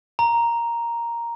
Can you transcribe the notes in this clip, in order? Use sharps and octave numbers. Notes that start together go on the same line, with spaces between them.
A#5